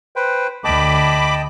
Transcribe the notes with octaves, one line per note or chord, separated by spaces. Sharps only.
B4 C5 G5
D2 D#5 G5 A5 B5 D6